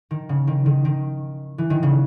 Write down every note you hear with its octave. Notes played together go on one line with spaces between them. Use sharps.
D#3
C#3
D#3
D#3
D#3
E3
D#3
C#3